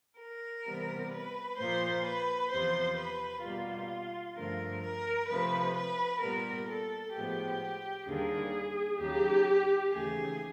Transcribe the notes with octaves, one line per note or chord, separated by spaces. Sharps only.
A#4
C3 E3 G3 B3
B4
A#2 F3 A#3 C5
B4
E2 C3 F3 C5
B4
B2 G3 A#3 F4
G2 D3 F3 A3 A#4
A#4
C3 F3 A3 B4
B4
A#2 G3 B3 A#4
A4
A2 F3 G#3 B3 G4
D#2 D3 G3 A#3 G#4
D#2 C#3 F#3 G4
D#2 C#3 E3 A3 G#4